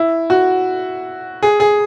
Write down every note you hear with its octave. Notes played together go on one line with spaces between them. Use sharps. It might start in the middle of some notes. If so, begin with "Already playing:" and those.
Already playing: E4
F#4
G#4
G#4